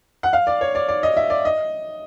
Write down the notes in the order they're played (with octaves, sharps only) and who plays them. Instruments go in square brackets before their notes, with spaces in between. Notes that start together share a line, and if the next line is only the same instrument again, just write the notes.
[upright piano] F#5
F5
D5
C#5
D5
D5
D#5
E5
D5
D#5